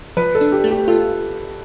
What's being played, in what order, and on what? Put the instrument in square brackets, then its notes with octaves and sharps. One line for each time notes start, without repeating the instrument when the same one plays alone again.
[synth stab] F3 [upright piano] B4
[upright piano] A4
[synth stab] D4
[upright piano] G4
[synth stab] A3
[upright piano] G4
[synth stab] F4 [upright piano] A4